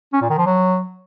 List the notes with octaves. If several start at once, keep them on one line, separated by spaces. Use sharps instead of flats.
C#4
A#2
D#3
F3
F#3